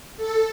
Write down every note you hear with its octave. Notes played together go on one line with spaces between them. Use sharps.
A4